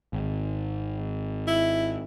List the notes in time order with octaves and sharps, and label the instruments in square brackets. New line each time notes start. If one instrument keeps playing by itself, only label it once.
[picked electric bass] G#1
[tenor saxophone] E4